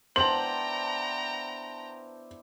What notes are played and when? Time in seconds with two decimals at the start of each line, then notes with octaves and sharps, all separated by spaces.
0.16 B3 D4 E4 C5 G5 A5 A#5 F#7